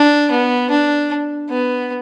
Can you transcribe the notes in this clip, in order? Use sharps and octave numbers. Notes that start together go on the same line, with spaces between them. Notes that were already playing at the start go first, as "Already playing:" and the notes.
Already playing: D4
B3
D4
B3